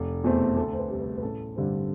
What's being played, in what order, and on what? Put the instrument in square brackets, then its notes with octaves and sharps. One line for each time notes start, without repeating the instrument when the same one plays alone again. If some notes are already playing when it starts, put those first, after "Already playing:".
Already playing: [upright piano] F1
E2 B2 A3 C4
D2 A4
C5
B4
C3 G3
B4
B4
A1 A4
G2 D3 G3 C4